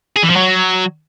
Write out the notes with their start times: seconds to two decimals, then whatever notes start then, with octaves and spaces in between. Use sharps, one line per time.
0.16 G#4
0.23 E3
0.29 F3
0.36 F#3